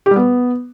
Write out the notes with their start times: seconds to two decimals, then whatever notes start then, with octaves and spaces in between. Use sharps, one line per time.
0.06 G4
0.11 G3
0.16 B3